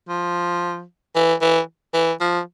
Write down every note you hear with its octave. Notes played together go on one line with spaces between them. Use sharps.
F3
E3
E3
E3
F3